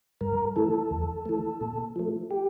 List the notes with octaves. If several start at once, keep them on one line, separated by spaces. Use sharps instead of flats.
G2 A#4
E3 A3 A4
E2
E3 A3
A#2
F3 A3
G4